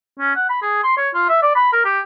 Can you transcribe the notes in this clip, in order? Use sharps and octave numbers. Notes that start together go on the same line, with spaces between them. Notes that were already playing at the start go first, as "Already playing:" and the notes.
C#4
F#5
B5
G#4
C6
C#5
F4
E5
D5
B5
A#4
G4